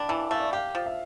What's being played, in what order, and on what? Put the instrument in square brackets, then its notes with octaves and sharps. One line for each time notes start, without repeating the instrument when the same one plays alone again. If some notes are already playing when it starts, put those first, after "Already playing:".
Already playing: [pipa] D4 [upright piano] F5 G5 B5
[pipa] E3 [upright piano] A5
[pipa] A3 [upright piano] F5
[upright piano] D5
E5
[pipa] G4 [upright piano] F5
[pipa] F3
[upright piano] E5